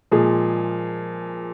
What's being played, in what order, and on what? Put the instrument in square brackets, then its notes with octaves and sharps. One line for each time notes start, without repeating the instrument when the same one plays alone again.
[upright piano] A#2 F3 G#3 G#4